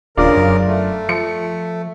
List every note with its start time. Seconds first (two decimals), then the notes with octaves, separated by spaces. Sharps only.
0.17 D#1 C#3 D4 F4 A#4 D5
0.37 F#2
0.66 A3
1.09 F3 C#7